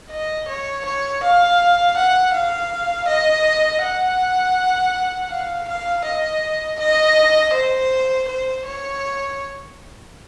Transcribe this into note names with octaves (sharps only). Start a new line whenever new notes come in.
D#5
C#5
C#5
F5
F#5
F5
D#5
F#5
F5
F5
D#5
D#5
C5
C5
C#5